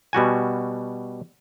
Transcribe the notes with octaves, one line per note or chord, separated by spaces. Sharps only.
B2 G3 F#4 G#5